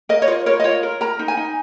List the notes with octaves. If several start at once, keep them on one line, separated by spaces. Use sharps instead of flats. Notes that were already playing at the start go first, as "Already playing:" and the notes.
A#4 D#5
C#5
F4 D#5
A#4 C#5
D#5
F4 C#5
A#4
A#4 A#5
D#4
G#5
D#4